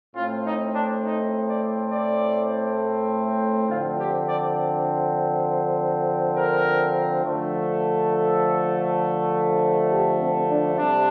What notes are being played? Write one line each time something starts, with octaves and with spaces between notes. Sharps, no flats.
A2 A3 C4 F4
D#4
D4
D#4
D5
D5
D3 F3 C4 F4
G4
D5
A#4
D3 F3 A3
A4
G4
C4
D4
C3 G3 D4